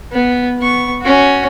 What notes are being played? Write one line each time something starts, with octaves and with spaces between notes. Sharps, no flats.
B3
B3 C#6
C#4 F#4